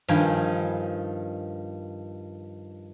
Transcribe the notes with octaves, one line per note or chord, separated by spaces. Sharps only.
G2 D#3 F3 G#5